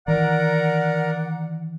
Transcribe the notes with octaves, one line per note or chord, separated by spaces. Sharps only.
D#3 E3 A#4 D5 F#5 A#5